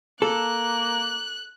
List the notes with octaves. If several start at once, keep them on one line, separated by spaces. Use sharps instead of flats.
A#3 A4 F#6